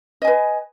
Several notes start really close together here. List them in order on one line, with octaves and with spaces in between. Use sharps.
D#5 G#5 B4